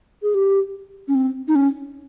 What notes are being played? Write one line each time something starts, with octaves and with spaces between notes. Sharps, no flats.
G#4
G4
C#4
C4
D#4
C#4